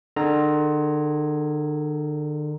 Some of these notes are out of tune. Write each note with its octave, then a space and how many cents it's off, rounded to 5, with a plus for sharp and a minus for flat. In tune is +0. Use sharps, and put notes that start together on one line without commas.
D3 +40 A4 -45 A#5 +0